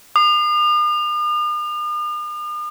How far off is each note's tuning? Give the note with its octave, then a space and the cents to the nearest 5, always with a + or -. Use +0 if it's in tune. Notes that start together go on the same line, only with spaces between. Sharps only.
D#6 -45